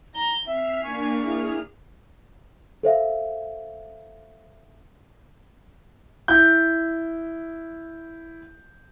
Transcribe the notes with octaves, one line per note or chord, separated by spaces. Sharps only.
A#5 G7
C4 E5 F6 B6 C7
A#3 D4 G#5 C#6
E4 G#4 F6
A4 C5 E5 F5
E4 G6